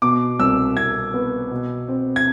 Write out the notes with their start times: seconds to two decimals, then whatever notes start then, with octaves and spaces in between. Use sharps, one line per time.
0.02 B2 D6
0.39 C2 E6
0.77 C2 G#6
1.14 B3
1.51 B2
1.88 C4
2.16 G#6